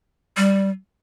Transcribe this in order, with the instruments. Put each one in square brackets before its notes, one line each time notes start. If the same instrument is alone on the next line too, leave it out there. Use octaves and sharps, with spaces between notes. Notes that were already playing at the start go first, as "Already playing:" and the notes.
[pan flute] G3